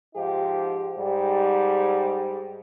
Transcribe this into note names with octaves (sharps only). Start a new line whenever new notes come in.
G#2 F3 D#4 G4
G#2 G3